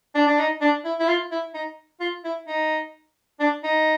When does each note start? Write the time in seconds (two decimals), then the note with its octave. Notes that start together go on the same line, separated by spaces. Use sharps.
0.15 D4
0.27 D4
0.38 D#4
0.61 D4
0.85 E4
1.00 E4
1.08 F4
1.31 E4
1.54 D#4
2.00 F4
2.24 E4
2.48 D#4
3.40 D4
3.64 D#4